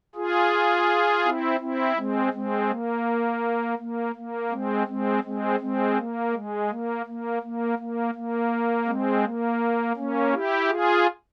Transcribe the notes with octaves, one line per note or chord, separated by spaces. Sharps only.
F4 G#4
C4 E4
C4 E4
G#3 C4
G#3 C4
A#3
A#3
A#3
G#3 C4
G#3 C4
G#3 C4
G#3 C4
A#3
G#3
A#3
A#3
A#3
A#3
A#3
G#3 C4
A#3
A#3 C#4
E4 G4
F4 G#4